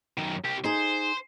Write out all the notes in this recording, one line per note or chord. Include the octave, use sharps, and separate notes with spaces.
F#2 D#3
C2 G4
D#4 G#4 C5